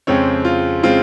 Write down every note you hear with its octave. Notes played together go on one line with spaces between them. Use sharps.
F2 C#3 G#3 C4 C#5
F4
C#3 G#3 C4 F4